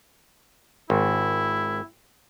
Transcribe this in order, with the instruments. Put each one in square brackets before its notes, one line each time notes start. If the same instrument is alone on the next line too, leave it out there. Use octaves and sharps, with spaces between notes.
[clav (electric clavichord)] G#1 [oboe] E4